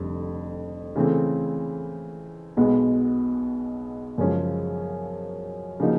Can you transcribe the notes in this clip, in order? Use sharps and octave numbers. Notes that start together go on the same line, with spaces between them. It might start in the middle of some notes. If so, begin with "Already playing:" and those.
Already playing: F1 F2 D3 G3
C#3 E3 A3 C4
B1 B2 G#3 B3
F#2 C#3 F3 G#3 C#4
C#3 F3 A#3 D#4 F#4